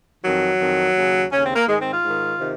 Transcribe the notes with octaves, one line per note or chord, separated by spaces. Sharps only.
F2 D#3 F#3
F2 D#3
D#2 C#3
D#2 C#3 C#4
C4
A#3
G#2 D#3 G#3
C4
F4
G#2 D#3
C3 D#3